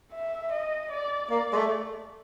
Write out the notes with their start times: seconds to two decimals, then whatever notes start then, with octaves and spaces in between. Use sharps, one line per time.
0.13 E5
0.52 D#5
0.91 D5
1.30 A#3 D5
1.53 G#3
1.56 A3